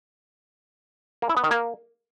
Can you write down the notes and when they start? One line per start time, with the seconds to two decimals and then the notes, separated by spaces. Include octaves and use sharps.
1.22 A#3
1.29 E4
1.37 B3
1.44 D#3
1.51 A#3